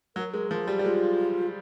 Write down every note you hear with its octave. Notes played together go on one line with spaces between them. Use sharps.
F#3 A#4
G#3 A#4
F3 A#4
G3
G3
G#3 F4